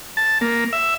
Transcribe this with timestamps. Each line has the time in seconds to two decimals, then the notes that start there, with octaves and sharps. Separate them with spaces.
0.17 A5
0.41 A#3
0.73 E5